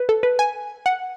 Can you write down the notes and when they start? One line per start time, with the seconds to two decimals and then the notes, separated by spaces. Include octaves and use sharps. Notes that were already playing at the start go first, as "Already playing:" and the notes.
Already playing: B4
0.09 A4
0.23 B4
0.39 G#5
0.86 F#5